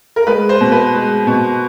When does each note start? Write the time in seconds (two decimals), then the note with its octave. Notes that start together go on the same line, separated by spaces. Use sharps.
0.16 A#4
0.27 G#3 B4
0.49 C5
0.61 B2
0.72 B4
0.94 G#3
1.27 B2